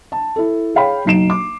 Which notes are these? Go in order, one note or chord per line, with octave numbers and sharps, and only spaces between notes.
A5
E4 A4
G#4 C#5 F5 G5 B5
F#1 B1 D#4 C7 D7 E7
D6